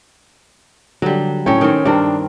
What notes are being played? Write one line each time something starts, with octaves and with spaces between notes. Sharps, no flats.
D3 F#3 G3
A2 C#4 C#5 G5
D#3 C4
G2 C4 D4 A#4